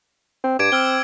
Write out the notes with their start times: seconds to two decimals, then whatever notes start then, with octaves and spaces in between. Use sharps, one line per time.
0.44 C4
0.59 G2 D6 G#6 D7
0.72 C4 E6 F6 G7